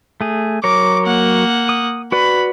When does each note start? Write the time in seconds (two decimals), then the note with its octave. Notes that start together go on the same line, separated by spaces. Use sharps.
0.21 A3 G#4
0.64 F#3 A#4 C#5 D6
1.05 A#3 F#5
1.69 D#6
2.12 F#4 B4 D5 B5